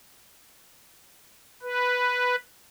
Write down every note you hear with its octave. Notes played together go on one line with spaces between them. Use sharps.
B4